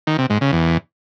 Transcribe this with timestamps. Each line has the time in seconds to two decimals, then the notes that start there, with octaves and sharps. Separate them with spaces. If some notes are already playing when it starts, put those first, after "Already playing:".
0.07 D#3
0.18 C3
0.30 G#2
0.41 C#3
0.53 E2